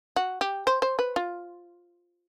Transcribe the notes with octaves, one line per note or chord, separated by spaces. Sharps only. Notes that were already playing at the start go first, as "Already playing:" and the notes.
F#4
G4
C5
C5
B4
F4